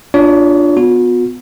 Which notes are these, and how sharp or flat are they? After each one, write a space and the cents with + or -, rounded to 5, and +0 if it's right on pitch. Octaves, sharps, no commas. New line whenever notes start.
D4 +0 F4 +0 C#5 +35
B3 +10 F#4 -45